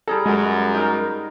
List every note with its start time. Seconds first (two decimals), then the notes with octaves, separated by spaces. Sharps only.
0.08 G3 G#4 A4 A#5
0.26 F#2 G#3
0.75 D#4 A#4